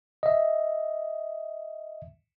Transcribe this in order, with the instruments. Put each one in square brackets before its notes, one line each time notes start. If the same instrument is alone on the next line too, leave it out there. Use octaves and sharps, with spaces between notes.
[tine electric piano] D#5 E5